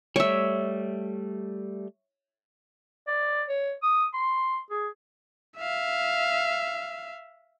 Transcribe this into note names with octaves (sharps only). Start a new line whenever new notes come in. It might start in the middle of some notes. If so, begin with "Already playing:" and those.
G3 A3 C#5 E5
D5
C#5
D#6
C6
G#4
E5 F5